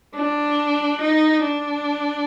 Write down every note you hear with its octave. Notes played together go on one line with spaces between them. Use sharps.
D4
D#4
D4